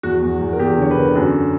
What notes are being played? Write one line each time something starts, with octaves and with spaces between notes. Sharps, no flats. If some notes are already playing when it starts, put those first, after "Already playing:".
E2 F#4
E2
E2
A#4
E2 G4
D3 C#5
B4
D3 A#4
G4
F#2 F#4